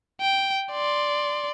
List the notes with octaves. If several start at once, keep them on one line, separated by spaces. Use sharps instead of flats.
G5
D5 C6